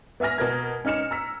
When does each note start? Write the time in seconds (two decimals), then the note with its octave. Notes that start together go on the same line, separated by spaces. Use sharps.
0.20 B3 E5 G#5 F6 A#6
0.38 B2 A#4 G#6
0.85 C#4 D#4 F6 C#7 E7
1.11 A#5 E6 B6